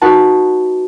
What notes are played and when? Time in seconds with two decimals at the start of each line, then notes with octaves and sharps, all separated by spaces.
0.02 D#4 F#4 B4 F#5 A5